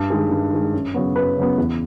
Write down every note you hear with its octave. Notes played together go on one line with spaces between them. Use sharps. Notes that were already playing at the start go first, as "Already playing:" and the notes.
Already playing: G2
D#3 G#3
G2
D#3 G#3
F#2
C#3 F#3 B3
F#2 B4
C#3 F#3 B3
E2